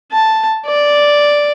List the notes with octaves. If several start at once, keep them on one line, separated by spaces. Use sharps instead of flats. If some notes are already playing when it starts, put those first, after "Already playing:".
A5
D5